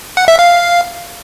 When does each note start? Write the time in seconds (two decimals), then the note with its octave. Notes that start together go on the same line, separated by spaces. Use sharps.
0.17 F#5
0.28 E5
0.39 F5